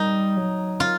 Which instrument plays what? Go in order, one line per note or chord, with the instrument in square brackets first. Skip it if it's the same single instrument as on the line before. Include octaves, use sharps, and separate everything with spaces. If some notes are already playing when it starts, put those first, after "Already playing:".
Already playing: [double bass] G3 [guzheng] D#4
[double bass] F#3
[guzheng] F4